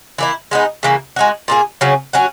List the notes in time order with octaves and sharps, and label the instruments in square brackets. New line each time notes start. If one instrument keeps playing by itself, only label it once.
[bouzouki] E3 A#3 E4
G#3 B3 D#4
C#3 E3 A#3
G#3 D#4 F#4
A#2 A#3 E4 G#4
C#3 F#3 C#4
F#3 C#4 F#4